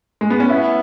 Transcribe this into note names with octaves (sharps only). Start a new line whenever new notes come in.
G#3
B3
C#4
B3 E4